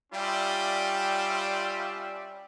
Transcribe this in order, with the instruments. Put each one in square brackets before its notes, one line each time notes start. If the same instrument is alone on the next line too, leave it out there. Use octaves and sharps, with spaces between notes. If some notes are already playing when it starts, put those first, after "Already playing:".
[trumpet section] G3 C#4 F4 D5 E5 G5